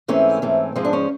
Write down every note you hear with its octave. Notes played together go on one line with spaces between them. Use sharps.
G#2 E3 A3 C4 C#4
G#2 E3 A3 C4
G#2 F3 G#3 C4
D4
C#4